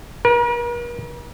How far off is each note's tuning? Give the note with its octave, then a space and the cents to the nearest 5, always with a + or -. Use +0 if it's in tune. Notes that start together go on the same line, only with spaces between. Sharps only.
A#4 +45